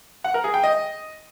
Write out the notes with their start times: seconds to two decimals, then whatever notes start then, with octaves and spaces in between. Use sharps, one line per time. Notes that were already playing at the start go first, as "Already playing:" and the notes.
0.24 F#5
0.34 A#4
0.44 G#4
0.54 G5
0.64 D#5